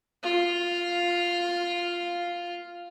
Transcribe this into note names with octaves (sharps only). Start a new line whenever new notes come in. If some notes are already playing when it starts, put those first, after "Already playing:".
F4 F5